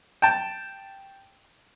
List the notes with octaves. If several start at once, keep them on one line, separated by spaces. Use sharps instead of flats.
G5 A5